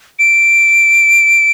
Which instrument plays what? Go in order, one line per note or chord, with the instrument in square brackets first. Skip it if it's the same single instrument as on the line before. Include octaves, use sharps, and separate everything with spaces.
[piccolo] D7